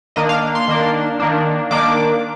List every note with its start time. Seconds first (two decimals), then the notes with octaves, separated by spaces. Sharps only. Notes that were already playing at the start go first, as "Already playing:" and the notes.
0.16 D#3 A#3 D4 D#5
0.29 F5
0.55 C6
0.68 D#3 A#3 D4
1.20 D#3 A#3 D4
1.71 D#3 A#3 D4 D6